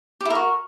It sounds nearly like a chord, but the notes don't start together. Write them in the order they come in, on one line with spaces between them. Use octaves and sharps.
G4 E4 A#4 F#4